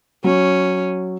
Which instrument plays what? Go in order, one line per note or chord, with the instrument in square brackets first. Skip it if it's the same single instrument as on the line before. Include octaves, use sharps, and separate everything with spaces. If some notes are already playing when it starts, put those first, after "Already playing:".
[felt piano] F#3 [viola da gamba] C#4